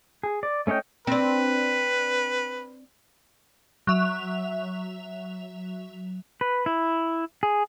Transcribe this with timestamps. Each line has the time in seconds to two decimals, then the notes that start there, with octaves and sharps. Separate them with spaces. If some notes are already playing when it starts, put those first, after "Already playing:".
0.23 G#4
0.43 D5
0.67 A3 C#4 C#5 D#5 G5
1.07 C4 D4 B4
3.87 F#3 E5 F7
6.41 B4
6.66 E4
7.43 G#4